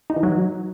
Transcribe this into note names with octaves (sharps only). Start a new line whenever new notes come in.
D#4
E3
F#3